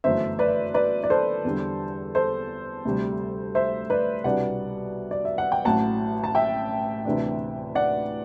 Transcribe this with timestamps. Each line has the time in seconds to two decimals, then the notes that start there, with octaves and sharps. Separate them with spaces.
0.04 G1 F#2 E3 A3 C5 E5
0.39 B4 D5
0.74 B4 D5
1.03 D5
1.10 A4 C5
1.45 E2 D3 G3
2.15 A4 C5
2.85 D2 C3 G3
3.55 C5 E5
3.90 B4 D5
4.24 C2 B2 G3 B3 D4 D5 F#5
5.11 D5
5.25 E5
5.38 F#5
5.52 G5
5.65 A1 A2 F#3 F#5 A5
6.24 A5
6.35 E5 G5
7.05 D2 C3 E3 B3 D4
7.75 D5 F#5